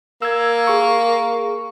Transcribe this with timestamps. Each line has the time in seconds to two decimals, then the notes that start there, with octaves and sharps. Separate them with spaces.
0.22 A#3 E6 G#6
0.67 G#4 C#6